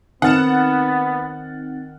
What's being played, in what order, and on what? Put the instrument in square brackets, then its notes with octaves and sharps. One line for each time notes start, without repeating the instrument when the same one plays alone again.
[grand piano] D#3 F6 E7 [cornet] B3 [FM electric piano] C4 D#4 A6 [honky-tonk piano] F#5